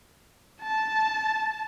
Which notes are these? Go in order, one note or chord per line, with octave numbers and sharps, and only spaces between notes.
A5